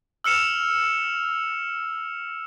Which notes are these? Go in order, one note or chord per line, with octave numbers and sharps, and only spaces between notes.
E6 F6 C#7 E7 F7